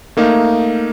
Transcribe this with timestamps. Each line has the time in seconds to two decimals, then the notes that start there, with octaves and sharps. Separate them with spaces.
0.17 A3 A#3 D#4 F5